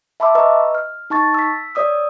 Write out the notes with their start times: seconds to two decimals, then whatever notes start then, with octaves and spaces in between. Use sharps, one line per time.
0.20 E5 A5 B5 C6 D6 E6
0.35 B4 D#5 A#5 C#6 E6
0.75 F6
1.10 D#4 A5 C#6 A6
1.34 E6 B6
1.75 C#5 D5 D#6 E6